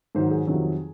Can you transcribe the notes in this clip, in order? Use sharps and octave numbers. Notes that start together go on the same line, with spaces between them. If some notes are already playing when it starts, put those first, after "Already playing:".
G#2 D#3 F#3 C5
G#4
F2 C3 D#3 F#3